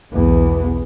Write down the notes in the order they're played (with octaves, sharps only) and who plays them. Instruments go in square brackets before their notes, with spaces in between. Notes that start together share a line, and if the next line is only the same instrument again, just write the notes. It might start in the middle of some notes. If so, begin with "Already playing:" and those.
[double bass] B1 E2